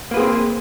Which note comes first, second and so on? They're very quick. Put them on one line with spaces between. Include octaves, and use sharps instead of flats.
A#3 B4 G#4 C4